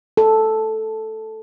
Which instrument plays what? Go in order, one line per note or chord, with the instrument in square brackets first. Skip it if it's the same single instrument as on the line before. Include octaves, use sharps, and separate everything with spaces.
[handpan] A4